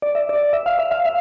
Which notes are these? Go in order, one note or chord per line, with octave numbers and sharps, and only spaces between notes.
D5
E5
D5
E5
F5
E5
F5
E5